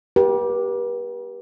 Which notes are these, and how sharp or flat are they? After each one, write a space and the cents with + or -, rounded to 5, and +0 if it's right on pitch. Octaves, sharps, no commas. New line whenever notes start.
G4 +0 B4 -45